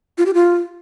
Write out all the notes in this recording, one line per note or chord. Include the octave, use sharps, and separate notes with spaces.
F4
G4
F4